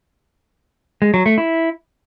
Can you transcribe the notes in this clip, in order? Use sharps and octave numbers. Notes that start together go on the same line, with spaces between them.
G#3
F#3
A3
E4